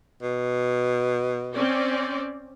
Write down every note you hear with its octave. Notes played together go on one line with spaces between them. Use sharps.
B2
C4 C#4 D5